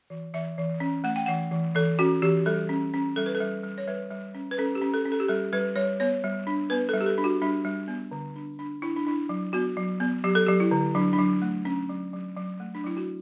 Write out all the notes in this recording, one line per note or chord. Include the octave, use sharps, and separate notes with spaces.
E3
E3 E5
E3
C#4
A3 F#5
G5
E3 F#5
E3
E3 A4
C#4 F#4
E3 G4
G3 A4
C#4
C#4
G3 A4
B4
A4
G3
G3
C#5
G3 B4
G3
C#4
B4
C#4 A4
G4
C#4
A4
C#4
A4
G4
G3 A4
G3 B4
G3 C#5
B3 C#5
G3
D4
B3 B4
G3 A4
G4
A4
D4
F#4
G3 D4
G3
B3
D3
D4
D4
D4 E4
D4
D4 E4
F#3
B3 F#4
F#3
B3
F#3 G4
A4
F#3 G4
E4
D3
F#3 D4
D4
F#3
A3
C#4
F#3
F#3
F#3
A3
D4
F#3 E4
F#4